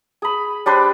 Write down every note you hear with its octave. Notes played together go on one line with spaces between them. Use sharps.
G#4 B5
G3 D4 B4 C5